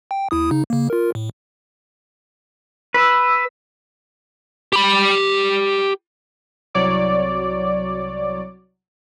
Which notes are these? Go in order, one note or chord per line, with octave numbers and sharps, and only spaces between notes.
G5
D#2 E4 D#6
C#3 D#4
C#3 A#3
F4 A#4
A2
B4 E6
G4 B5
C2 F#3 C#5 D5 D6